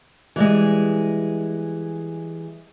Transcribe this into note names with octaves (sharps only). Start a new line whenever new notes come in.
E3 G3 G#3